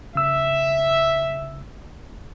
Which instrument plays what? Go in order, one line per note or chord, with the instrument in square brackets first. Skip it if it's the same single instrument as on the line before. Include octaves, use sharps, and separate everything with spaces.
[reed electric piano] C#3 E6 [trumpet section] E5